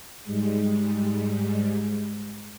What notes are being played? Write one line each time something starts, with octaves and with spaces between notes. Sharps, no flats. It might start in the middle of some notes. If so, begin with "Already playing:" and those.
G#2 G3 G#3